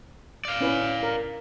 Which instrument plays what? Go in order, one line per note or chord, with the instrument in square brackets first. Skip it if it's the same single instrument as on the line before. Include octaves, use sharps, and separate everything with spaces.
[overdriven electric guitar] D5 F5
[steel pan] C#4 E4 B4
A#4